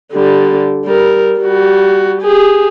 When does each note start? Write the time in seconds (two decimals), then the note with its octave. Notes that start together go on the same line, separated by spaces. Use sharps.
0.14 D3 G3
0.85 G3 A#4
1.40 G3 F#4
2.22 G4 G#4